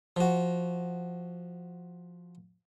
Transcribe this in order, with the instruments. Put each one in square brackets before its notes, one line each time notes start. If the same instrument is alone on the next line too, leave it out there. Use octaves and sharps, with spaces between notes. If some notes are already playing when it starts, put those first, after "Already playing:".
[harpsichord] F3 F#4